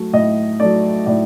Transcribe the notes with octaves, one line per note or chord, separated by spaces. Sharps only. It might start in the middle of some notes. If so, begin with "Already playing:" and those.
Already playing: F#3 A3
A2 D#5
F#3 A3 D5
A2 D5